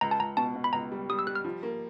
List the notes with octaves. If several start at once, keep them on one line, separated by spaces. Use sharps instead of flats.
C#2 A#5
A5
C#2 A#5
B2 A5
B2
B5
C#2 A#5
G3
G3 D#6
E6
G3 F#6
F6
F3
A#3